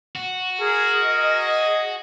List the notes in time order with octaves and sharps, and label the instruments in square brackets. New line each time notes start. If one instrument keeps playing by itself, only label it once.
[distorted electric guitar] F#4
[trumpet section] G#4 [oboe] A#4
[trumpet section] G#4 D#5